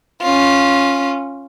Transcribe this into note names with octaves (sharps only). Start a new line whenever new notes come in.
C#4 F4